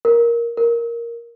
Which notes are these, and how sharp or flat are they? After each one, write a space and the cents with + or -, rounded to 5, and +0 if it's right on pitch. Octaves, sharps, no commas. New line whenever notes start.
A#4 +5
A#4 +0